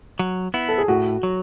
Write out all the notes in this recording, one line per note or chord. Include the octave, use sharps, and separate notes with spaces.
F#3
B3 E4
A4
G#4
A2 F#4
F#3